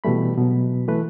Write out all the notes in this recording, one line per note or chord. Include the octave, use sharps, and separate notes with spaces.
B2 E3 G3 A3 B5
B2 F#3
E3 A3 B4